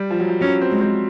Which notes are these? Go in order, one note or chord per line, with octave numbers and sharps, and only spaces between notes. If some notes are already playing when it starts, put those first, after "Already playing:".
Already playing: G3
F3
F#3
F3
F#3 C#4
C4
G#3
C4